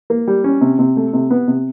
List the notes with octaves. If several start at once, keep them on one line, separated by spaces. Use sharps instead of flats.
A#3
G3
C#4
C3
C3
A3
C3
B3
C3